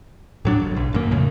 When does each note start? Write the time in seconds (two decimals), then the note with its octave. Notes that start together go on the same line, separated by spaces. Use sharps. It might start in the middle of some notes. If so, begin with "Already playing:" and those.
0.45 A2 F#3 D4
0.62 G1
0.76 B1
0.93 G#1 F#2 A#3
1.11 F2 A2 C#3